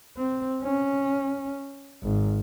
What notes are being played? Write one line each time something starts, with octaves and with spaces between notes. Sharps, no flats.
C4
C#4
G#1